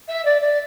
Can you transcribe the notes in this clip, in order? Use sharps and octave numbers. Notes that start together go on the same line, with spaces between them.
E5
D5
D5